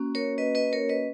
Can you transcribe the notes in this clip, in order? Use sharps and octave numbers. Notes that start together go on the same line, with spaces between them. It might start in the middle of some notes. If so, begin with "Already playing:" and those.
Already playing: A#3 C#4 F#4
A#4 C#5
B4 D#5
B4 D#5
A#4 C#5
B4 D#5